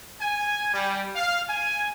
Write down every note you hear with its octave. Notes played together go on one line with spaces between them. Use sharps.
G#5
G3
F5
G#5